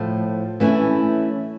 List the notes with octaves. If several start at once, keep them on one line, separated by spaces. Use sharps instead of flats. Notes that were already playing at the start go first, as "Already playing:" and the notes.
Already playing: A2 F3 A3
E3 A3 C#4 E4